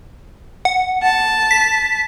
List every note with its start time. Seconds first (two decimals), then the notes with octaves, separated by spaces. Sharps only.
0.65 F#5
1.03 A5
1.51 B6